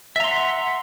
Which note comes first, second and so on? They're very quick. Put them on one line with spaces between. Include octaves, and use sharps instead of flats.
E5 A#5 C6 F#5